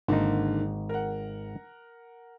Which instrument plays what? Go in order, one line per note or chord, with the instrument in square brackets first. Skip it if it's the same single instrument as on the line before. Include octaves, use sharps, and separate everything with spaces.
[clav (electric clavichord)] G#1 D#4 [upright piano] D3 D#3 A#3
[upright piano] A#4 F#5